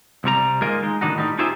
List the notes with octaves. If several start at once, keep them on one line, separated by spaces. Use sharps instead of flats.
C2 C3 G3 A#5
D#3 G#3 A#3 F4 A#4 D#5
G#3 D#4
A2 D#3 D4 D#4 F#4
A2 G3 D#4
D#4 F4 G4 G#4 C5 E5